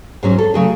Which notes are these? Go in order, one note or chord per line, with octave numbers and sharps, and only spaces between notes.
G#2 F#3 C#4 G#4
A4
C#3 F#3 A3 G#4